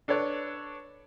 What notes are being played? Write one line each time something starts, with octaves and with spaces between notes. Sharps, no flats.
D4 A4 B4 C#5 D5